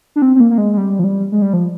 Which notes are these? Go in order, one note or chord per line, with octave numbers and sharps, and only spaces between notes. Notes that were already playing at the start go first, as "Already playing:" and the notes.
D4
C4
C4
A#3
A#3
G#3
G#3
G3
F3
G3
G#3
G3
F3